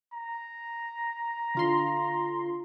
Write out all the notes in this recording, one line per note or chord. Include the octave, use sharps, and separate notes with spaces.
A#5
D3 F4 C6